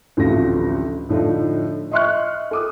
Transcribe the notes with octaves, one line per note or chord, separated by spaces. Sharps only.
A1 D2 C3 F3 A3 A#6
A2 D3 F3 A3 D#4
D#5 E5 C6 C#6 F6 F#6
A4 D6 D#6